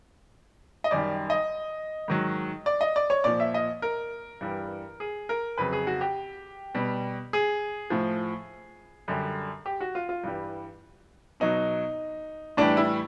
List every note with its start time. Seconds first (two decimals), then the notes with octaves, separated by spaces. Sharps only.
0.84 D#5
0.91 F#2 D#3 G3 D5
1.30 D#5
2.08 G#2 D#3 F#3
2.66 D5
2.81 D#5
2.96 D5
3.10 C#5
3.24 A#2 F3 D5
3.40 E5
3.54 D#5
3.82 A#4
4.41 G2 E3 G3
5.00 G#4
5.29 A#4
5.58 F2 C#3 F#3 B4
5.73 G#4
5.87 F#4
6.01 G4
6.75 B2 G3
7.33 G#4
7.90 A2 F3
9.08 F#2 D3 G3
9.66 G4
9.81 F#4
9.95 F4
10.09 F4
10.24 G2 E3 G3
11.40 B2 F#3 D#4
12.57 A2 E3 G3 D4
12.77 E4